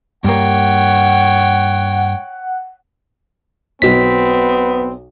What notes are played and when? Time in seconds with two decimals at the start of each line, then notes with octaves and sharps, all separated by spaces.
0.24 G2 A#3 C#5 F#5 G5
3.82 B1 F#3 B3 C4 B6